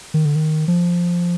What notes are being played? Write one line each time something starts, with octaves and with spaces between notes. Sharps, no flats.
D#3
D3
D#3
F3